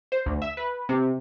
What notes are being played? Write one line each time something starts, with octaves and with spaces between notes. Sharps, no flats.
C5
D2
E5
B4
C3